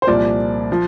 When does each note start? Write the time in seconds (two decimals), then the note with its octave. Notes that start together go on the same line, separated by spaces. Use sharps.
0.02 C5
0.07 C2 A#2 F3 D5
0.72 F3